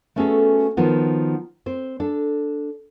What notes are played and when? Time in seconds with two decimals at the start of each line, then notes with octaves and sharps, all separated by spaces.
0.16 A3 B3 C#4 F#4 G#4 A4
0.77 D#3 F3 B3 F#4
1.66 C4 C5
2.00 D4 A4